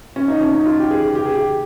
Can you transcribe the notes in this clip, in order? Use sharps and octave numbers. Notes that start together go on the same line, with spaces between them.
C#4
D#4
C#4
D#4
F4
G4
G#4
G4
G#4
G4